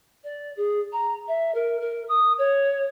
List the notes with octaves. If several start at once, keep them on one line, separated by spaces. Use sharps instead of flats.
D5
G#4
A#5
E5
A#4
A#4
D#6
C#5